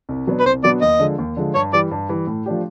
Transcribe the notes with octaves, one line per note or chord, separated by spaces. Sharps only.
C2
B2 F#3 B3 D4
B4
C2 C5
B2 F#3 B3 D4 D5
D#2 D#5
D3 F3 G#3
D#2
D3 F3 G#3
G2 C#5
E3 G3 D5
G2
E3 G3
A2
F3 A3 D4 G4